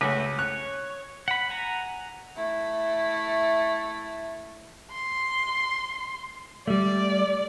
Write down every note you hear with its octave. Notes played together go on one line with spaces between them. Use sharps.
C#2 A3 F#4 B4
C#5 F#6
F#5 B5
F#5 G#5 A#5
A3 E4
C6
G3 A3 D5